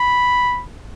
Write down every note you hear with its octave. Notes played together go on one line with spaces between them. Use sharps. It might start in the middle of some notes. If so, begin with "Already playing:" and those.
Already playing: B5